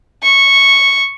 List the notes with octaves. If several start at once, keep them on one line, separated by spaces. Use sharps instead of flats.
C#6